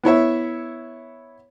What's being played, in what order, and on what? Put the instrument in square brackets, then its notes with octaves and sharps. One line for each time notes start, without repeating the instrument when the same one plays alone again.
[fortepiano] B3 E4 C#5 E5